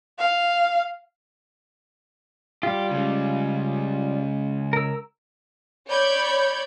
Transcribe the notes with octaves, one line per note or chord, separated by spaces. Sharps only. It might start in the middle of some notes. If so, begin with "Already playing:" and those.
F5
G3 F4 G4
C#3 G#3
A#4 E6
C#5 D5 B5 G6 G#6